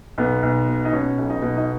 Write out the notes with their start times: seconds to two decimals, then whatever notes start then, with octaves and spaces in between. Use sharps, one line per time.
0.18 B1 B3
0.43 B1
0.68 B2
0.85 D#4
0.93 B2 C#4
1.18 B1
1.30 D#4
1.42 B2
1.57 D#4